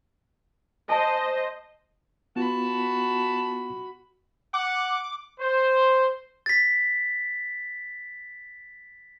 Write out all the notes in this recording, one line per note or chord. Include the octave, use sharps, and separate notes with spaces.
C5 D#5 G#5 A5
B3 F4 F#4 A5 B5
F#5 D6
C5
A6 B6